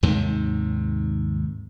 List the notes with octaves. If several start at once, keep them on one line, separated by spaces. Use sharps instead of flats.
D#2 G#2 C3 D#3